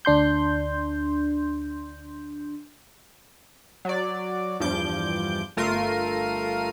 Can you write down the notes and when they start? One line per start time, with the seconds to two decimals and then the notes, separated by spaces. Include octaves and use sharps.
0.05 D2 D4 C6 G6
3.85 F#3 D5
4.60 E2 G2 F3 D6 G6
5.57 G1 A3 F4 A#4 C7 D#7